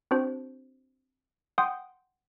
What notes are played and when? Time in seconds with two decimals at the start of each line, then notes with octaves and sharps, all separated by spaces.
0.11 C4 D4 F#4 C5
1.58 F#5 G5 C6 D#6 G6